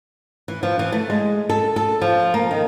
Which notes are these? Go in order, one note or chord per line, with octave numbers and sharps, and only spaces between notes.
E3
F3
E3
A3
G#3
A4
A4
F3
A#3
D#3